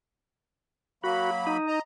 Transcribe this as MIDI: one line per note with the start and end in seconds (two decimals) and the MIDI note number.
1.04 1.57 54
1.04 1.57 58
1.04 1.30 66
1.04 1.57 83
1.47 1.79 63
1.67 1.81 75
1.67 1.81 82